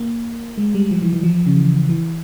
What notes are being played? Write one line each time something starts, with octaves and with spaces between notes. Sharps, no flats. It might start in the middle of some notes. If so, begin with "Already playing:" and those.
Already playing: A#3
G#3
G3
F3
E3
E3
F3
C#3
E3
E3